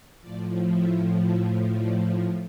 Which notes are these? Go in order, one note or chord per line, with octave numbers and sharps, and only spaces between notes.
A2 F3 D5
E5
E5
D5